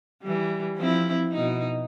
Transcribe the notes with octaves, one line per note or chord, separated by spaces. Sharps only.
E3 G3
F3 C4 E4
B2 D#4